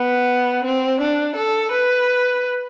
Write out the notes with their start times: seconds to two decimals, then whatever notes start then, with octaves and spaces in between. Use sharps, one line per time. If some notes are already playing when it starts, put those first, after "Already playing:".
Already playing: B3
0.64 C4
1.01 D4
1.36 A4
1.72 B4